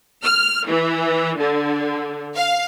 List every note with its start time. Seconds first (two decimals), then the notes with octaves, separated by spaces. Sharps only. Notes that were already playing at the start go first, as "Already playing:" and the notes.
0.24 F6
0.68 E3
1.38 D3
2.35 F5